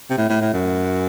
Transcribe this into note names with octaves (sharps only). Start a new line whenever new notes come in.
C3
A2
A2
A2
F#2